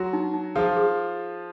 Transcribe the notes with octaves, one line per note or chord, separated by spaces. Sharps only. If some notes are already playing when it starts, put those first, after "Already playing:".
Already playing: F#3 F#4 C6
D#4
D#4
F3 F4 G#4
G#4